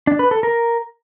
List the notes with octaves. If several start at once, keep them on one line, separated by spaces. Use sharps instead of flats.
D4
B4
A4
A#4